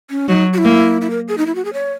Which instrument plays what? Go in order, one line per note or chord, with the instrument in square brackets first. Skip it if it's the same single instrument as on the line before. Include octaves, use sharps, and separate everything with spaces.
[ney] C#4
[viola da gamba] F#3 [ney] D#4
[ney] F#4
E4
[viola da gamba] A#3
[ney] E4
A#4
G#4
D#4
E4
F#4
G#4
C#5